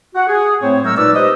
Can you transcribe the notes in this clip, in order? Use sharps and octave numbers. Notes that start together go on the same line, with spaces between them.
F#4 F#5
G#4
A2 A3 C4 C5 C#5
F#3 G#3 A3 A#4 C#5 E6
A#2 D#4 B4 D5 E6
G4 B4 C5 D#5